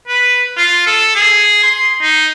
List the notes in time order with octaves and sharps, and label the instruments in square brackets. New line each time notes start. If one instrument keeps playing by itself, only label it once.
[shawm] B4
F4
A4
G#4
C6
D#4